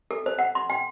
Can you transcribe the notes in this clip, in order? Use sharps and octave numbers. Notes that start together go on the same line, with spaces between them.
A4
C5
F#5
C6
G5